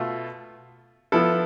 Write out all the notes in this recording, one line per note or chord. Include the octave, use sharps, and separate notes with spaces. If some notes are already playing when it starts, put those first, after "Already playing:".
Already playing: B2 A3 F4
F3 B3 E4 A4